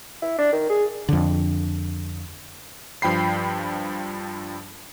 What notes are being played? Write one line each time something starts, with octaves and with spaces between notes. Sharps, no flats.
E4
D4
D#3
G#4
F2 D3
G2 F3 G5 B5 C7